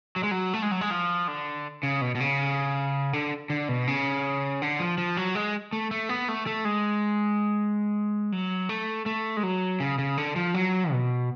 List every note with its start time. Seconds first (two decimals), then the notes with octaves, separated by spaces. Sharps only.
0.16 F#3
0.23 G#3
0.31 F#3
0.53 A3
0.62 G#3
0.71 F#3
0.81 G#3
0.91 F3
1.28 D3
1.83 C#3
2.01 B2
2.15 B2
2.20 C#3
3.13 D3
3.50 D3
3.69 B2
3.87 C#3
4.62 D3
4.80 F3
4.98 F3
5.17 F#3
5.35 G#3
5.73 A3
5.91 A3
6.09 B3
6.28 A3
6.46 A3
6.65 G#3
8.32 F#3
8.69 A3
9.06 A3
9.37 G#3
9.43 F#3
9.80 C#3
9.98 C#3
10.17 D3
10.36 F3
10.54 F#3
10.92 B2